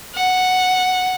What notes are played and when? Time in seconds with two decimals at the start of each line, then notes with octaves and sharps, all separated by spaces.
0.15 F#5